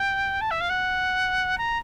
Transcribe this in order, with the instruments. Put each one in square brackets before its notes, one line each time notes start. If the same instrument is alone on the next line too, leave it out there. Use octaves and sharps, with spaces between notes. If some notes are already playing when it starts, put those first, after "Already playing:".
Already playing: [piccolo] G5
A5
E5
F5
F#5
A#5